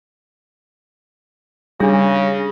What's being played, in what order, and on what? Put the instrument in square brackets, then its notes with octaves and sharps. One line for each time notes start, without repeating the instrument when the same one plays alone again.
[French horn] C#3 [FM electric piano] G3 A#6 [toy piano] D4 G#4